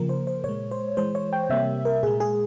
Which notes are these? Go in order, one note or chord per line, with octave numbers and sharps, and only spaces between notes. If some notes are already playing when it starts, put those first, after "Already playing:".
Already playing: C#3 F3 A#3 A#4
C5
C5
A#2 G#3 C#5
C5
E3 G#3 C5
C#5
G5
C3 G3 A#3 E5
A#4
A#2 G#3 G#4
G#4